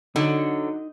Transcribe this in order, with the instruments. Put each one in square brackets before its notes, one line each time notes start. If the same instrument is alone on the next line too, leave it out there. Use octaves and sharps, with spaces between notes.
[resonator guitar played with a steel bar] D3 F#3 [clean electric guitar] D#4